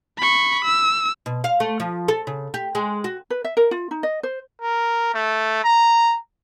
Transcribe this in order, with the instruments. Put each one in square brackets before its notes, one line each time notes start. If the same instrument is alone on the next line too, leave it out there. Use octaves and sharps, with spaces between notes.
[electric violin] B5 C#6
E6
[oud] B2
F5
A3
F3
A4
C#3
G4
G#3
F#4
[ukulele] B4
E5
A#4
F4
D#4
D#5
C5
[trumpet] A#4
A3
A#5